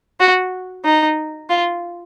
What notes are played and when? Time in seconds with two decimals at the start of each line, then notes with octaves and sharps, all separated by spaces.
0.20 F#4
0.85 D#4
1.50 F4